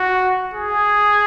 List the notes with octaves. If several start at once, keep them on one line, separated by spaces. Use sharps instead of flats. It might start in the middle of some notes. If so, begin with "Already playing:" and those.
Already playing: F#4
G#4